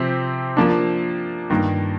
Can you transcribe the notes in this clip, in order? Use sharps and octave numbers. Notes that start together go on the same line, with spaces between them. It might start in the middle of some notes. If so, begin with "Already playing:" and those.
Already playing: C3 F3 C4 G4 C5
F3 A#3 D4
G2 D#3 A#3